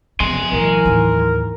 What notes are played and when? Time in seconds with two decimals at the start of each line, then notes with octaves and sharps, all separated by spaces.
0.20 F2 C#3 B3 G#5 C6
0.52 A#1 E3 F#3 A#4
0.85 D#2 A2